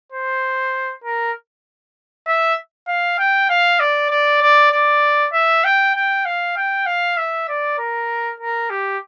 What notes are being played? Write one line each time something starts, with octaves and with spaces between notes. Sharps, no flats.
C5
A#4
E5
F5
G5
F5
D5
D5
D5
D5
E5
G5
G5
F5
G5
F5
E5
D5
A#4
A#4
G4